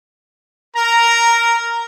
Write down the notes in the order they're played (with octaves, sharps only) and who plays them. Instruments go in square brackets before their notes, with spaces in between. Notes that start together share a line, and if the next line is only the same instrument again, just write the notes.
[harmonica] A#4 [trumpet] A#5